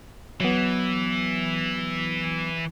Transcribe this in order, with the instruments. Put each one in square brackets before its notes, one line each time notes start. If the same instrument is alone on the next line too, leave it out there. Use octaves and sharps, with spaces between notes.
[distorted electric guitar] E3 [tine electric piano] F#3 B3